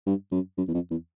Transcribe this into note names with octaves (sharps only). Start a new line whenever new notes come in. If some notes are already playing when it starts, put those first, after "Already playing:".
G2
F#2
F#2
E2
F2
E2